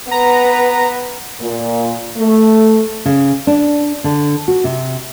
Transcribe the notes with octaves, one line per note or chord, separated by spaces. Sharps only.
B3 B4 A#5
A#2
A3
C#3
D4
D3
F#4
C3